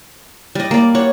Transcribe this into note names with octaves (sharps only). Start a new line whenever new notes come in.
G3 D#5
A#3 D5
C#5 F#5